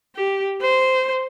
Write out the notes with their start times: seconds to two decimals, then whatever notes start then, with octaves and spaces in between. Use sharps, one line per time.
0.16 G4
0.62 C5